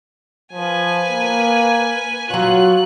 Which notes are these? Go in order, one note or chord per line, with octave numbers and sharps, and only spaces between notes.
F3 B4 G#5
A#3
F#3 F4 C#5 F#6